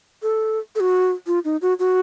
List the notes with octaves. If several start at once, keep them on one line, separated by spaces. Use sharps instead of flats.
A4
A4
F#4
F4
D#4
F#4
F#4